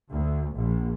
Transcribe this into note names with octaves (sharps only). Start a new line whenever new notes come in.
D2
A#1